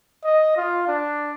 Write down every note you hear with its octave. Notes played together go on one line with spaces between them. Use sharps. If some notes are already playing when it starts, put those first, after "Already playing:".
D#5
F4
D4